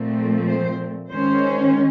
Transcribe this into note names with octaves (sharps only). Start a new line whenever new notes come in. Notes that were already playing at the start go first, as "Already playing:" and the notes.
Already playing: A#2 F3 A3 C4
C5
D#3 G#3 C#4 C5